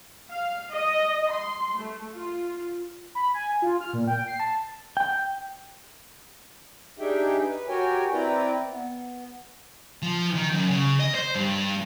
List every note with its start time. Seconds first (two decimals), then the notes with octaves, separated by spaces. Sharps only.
0.31 F5
0.72 D#5
1.32 C6
1.79 A3
2.14 F4
3.15 B5
3.34 G#5
3.62 F4
3.81 F6
3.93 A#2
4.08 G5
4.27 C7
4.40 A5
4.97 G5
6.99 D4 D#4 G4 G#4 E5 G5
7.42 B4
7.68 F#4 G4 A#4 C#5 G5 G#5
8.13 C4 E4 B4 D5 G5 A#5
8.69 B3
10.02 F3
10.35 D#3
10.53 F#2
10.69 C#3
11.00 D#5
11.15 C5
11.36 G2